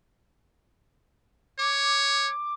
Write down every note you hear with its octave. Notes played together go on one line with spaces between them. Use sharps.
C#5 D6